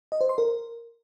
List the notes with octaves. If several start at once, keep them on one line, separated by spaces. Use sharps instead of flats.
D#5
C5
C6
A#4